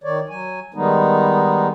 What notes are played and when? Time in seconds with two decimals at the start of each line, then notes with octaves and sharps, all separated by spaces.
0.04 D#3 C#5 D5
0.29 F#3 G#5
0.74 D#3 G3 G#3 B3 D#4